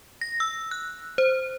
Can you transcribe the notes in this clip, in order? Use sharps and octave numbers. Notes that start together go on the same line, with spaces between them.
A#6
E6
F#6
C5